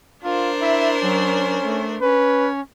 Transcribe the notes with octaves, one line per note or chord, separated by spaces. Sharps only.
D4 F4 A#4 C5
E4 E5
F#3 C#4
A3
C#4 B4